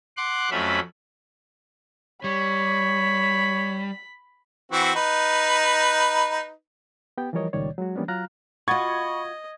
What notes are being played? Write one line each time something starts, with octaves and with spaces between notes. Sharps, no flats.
F#5 C6 D6 F#6
F2 F#3 A3 C#4 E5 B5
G3 C#5 B5
E3 C4 F#4
D#4 B4
B3 G4 G5
E3 F3 G3 A#4 C#5 D#5
C#2 A#2 D#3 G3 C#5 D5
F#3 G#3 F#4
E3 G3 A#3 B3 C#4 D4
F#3 F4 F5 A#5 F6 F#6
F4 F#4 D#5 B5 C#6 G#6 A6